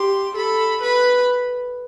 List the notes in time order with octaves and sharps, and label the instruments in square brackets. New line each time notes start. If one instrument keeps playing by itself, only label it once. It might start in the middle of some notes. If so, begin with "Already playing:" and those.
Already playing: [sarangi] G4 [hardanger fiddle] C6
[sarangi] A4 [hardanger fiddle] B5
[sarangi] B4 [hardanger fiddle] B5